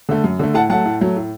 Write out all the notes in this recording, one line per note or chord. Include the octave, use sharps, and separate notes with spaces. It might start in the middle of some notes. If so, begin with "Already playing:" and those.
D3 A3
F#2
D3 A3
A2 F#5 A5
F#3 A3 F#5 A5
A2
F#3 A3
A2